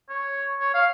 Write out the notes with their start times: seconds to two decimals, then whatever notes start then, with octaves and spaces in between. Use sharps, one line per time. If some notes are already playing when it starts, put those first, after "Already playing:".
0.10 C#5
0.60 C#5
0.74 F5